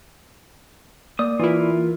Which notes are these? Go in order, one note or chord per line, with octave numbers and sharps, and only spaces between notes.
A#3 D5 D#6
E3 E4 F4 A#4